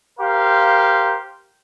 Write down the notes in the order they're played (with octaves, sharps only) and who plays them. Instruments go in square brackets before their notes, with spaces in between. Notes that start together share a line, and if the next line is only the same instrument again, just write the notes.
[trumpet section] G4 A#4 C5 F5